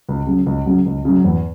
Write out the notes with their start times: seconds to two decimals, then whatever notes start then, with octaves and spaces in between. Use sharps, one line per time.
0.09 C#2
0.27 C#3 F#3
0.46 C#2
0.66 C#3 F#3
0.86 C#2
1.05 C#3 F#3
1.24 E2